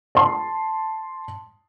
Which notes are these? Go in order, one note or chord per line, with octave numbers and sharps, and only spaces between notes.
A5 C6